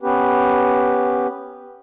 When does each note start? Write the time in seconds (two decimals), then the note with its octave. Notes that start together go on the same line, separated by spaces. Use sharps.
0.03 B3 C#4 G4 B4